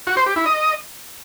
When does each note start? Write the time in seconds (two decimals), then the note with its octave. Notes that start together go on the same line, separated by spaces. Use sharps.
0.07 F#4
0.17 C5
0.26 G4
0.36 E4
0.46 D#5